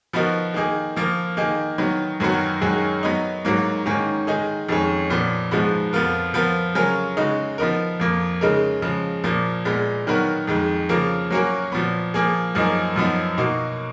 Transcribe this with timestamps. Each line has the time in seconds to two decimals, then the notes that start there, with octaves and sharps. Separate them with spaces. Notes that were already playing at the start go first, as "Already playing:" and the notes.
0.13 F3 B3 D#4 F#4 A#4
0.54 D#3 A#3 D#4 G#4
0.96 F3 A#3 F4 A#4
1.37 D#3 A#3 D#4 G#4
1.78 D#3 F#3 B3
2.20 F#2 D#3 F#3 B3 F#4
2.61 F#2 D#3 G#3 C#4 F#4
3.03 F#3 B3 D#4
3.45 G#2 F#3 A#3
3.86 G#2 D#3 A#3 C#4
4.27 D#3 G#3 D#4 G#4
4.68 F2 D#3 G#3 C#4
5.10 A#2 F3 B3
5.51 G#2 F3 G#3 B3 F#4
5.93 F2 F3 B3 F4 A#4
6.34 F3 B3 F4 A#4
6.75 C#3 F#3 C#4 F4 A#4
7.17 C#3 G#3 D#4 F#4
7.58 F3 B3 D#4 A#4
7.99 F2 F3 A#3
8.41 C#3 G#3 D#4 A#4
8.82 C#3 F3 G#3
9.24 A#2 F3 A#3
9.65 A#2 G#3 B3
10.07 D#3 F#3 B3 F#4 A#4
10.47 F2 D#3 G#3
10.89 C#3 F3 A#3 F4 A#4
11.31 F#3 A#3 C#4 F#4 A#4
11.72 A#2 F3 B3
12.14 F3 A#3 F4 G#4
12.55 F#2 F3 A#3 D#4 G#4
12.96 F#2 F3 B3 D#4
13.38 B2 A#3 D#4 F#4